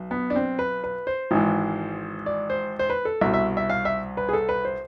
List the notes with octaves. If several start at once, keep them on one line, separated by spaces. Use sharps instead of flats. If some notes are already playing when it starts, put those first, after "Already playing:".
Already playing: B1
B3
D4
C4
B4
B4
C5
G#1 G#2 E3
D5
C5
C5
B4
A4
C2 B2 E5
E5
E5
F5
E5
B4
G#4
A4
B4
C5